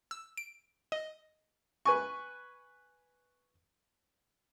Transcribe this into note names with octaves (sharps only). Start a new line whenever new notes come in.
E6
D7
D#5
B4 G#5 C#6